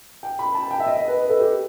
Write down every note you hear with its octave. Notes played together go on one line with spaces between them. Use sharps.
G5
B5
A5
G5
E5
D#5
D#5
B4
B4
A4
G4